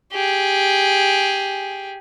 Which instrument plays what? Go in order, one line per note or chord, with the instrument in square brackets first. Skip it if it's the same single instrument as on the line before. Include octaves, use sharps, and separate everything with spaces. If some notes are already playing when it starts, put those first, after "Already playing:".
[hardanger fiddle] G4 G#4